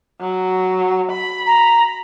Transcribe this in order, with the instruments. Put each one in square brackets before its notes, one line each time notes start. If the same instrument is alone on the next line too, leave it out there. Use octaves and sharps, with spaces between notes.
[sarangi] F#3
B5
[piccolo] A#5